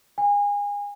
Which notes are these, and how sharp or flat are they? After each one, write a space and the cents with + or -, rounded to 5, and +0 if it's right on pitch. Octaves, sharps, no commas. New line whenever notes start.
G#5 -30